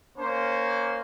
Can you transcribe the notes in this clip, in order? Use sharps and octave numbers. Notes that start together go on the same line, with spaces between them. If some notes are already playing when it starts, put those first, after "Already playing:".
A#3 C#4 C5